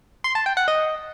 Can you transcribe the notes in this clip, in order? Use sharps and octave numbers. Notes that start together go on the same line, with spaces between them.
C6
A5
G5
F#5
D#5